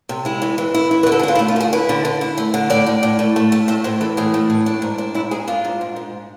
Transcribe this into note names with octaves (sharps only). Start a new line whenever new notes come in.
C3
G#3 E4
E3
E3
E4
E4
B4
D3
A4
G#4
E4
F4
E4
A3
F4
D3 G#4
E4 B4
D3
D3
E4
A3
D3
A2 D5
A2
A2
A3
A3
A3
A2 E5
A2 C5
E3 A4
A2 G#4
A3
A2
D4
G#2
D4
G#2 E4
G#2 G#4
D4 F4
G#2
G#2
G#2